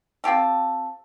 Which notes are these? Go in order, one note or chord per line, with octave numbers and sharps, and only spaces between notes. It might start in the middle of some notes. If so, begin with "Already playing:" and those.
C4 F4 G4 A4